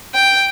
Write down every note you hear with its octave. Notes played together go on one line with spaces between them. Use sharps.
G5